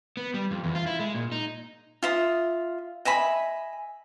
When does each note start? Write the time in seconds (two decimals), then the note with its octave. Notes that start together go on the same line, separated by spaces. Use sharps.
0.17 B3
0.34 G3
0.51 F2
0.64 E2
0.75 F4
0.87 E4
1.00 G#3
1.14 A#2
1.32 D#4
2.03 F4 E5 D#6
3.05 D#5 E5 G#5 B5